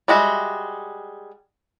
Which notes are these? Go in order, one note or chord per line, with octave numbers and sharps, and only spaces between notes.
G3 G#3 F#4 E5